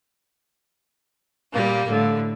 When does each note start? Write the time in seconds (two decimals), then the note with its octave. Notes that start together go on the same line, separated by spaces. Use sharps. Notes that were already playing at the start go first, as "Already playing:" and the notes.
1.52 A#2 G3 A#3
1.88 A2 D3